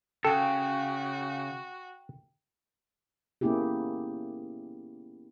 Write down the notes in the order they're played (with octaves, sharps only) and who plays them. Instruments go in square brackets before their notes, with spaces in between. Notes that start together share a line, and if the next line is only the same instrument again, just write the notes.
[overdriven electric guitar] C#3 [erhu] F#4 [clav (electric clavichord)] A4 [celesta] G5
[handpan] A#3 B3 C#4 E4 G4 G#4